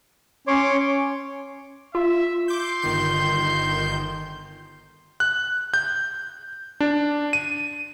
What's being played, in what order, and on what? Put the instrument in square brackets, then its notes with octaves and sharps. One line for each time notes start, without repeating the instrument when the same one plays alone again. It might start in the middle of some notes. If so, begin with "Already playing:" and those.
[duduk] C#4 [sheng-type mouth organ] C#5 C6 D6
[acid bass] F4 [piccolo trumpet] E5
[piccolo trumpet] C6 [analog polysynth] D6 G6
[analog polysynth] G1 D#3 G6
[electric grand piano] F#6
G6
D4
D#7